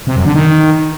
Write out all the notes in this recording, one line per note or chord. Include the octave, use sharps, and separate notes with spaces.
C3
F#2
D3
D#3